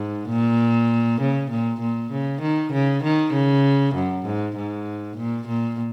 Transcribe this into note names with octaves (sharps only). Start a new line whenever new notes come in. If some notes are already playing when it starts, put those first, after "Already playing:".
Already playing: G#2
A#2
C#3
A#2
A#2
C#3
D#3
C#3
D#3
C#3
F#2
G#2
G#2
A#2
A#2